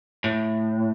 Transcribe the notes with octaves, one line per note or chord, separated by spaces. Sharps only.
A2